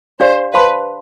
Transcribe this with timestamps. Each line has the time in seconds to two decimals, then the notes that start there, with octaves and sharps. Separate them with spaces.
0.20 D4 G4 C5 D5 F5
0.54 B4 C5 F5 A5 C6